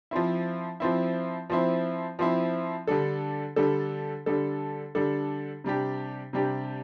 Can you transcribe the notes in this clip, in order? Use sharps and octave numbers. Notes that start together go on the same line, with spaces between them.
F3 C4 E4
F3 C4 E4
F3 C4 E4
F3 C4 E4
D3 G3 D4 A4
D3 G3 D4 A4
D3 G3 D4 A4
D3 G3 D4 A4
C3 G3 D4 G4
C3 G3 D4 G4